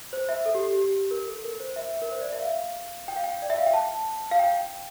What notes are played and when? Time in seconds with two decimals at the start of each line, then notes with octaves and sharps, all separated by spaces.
0.13 C5
0.29 E5
0.46 A4
0.55 G4
0.73 G4
1.11 A#4
1.28 A4
1.44 A#4
1.60 C5
1.76 E5
2.02 A#4
2.11 C5
2.21 D5
2.32 E5
2.42 F5
3.08 G5
3.16 F5
3.24 G5
3.42 D5
3.50 E5
3.58 F5
3.66 G5
3.73 A5
4.31 F5
4.39 G5